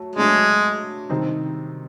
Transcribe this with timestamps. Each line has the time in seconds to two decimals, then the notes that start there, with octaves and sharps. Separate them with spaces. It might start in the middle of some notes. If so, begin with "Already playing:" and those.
Already playing: F#3 A3
0.16 F#3 G#3 A3 D4
1.09 C3 D#3 G3 C4 D#4